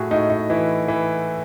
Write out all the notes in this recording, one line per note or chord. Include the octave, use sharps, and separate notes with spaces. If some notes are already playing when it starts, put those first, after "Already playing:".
Already playing: A2 F#4 G#4
A2 D#4
D#4
E3 E4
E3